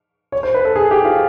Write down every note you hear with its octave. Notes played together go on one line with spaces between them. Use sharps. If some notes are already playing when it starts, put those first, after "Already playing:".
C#5
C5
B4
A4
G#4
G4
F4